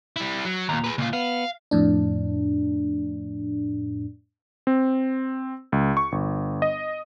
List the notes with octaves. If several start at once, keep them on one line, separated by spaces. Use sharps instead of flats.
G3 E4
F#3
D#2 A#2 A#5
G#4 B4
C#2 A#2 F4
B3 F5
F2 A2 D4
C4
C#2
C#6
G1
D#5